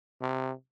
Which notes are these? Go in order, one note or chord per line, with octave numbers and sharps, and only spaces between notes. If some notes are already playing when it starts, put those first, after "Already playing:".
C3